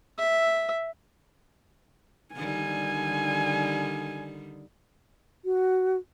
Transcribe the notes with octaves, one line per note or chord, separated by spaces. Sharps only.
E5
D3 D#3 G3 G#5
F#4